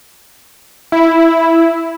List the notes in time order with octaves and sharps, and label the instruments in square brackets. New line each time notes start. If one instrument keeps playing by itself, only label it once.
[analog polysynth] E4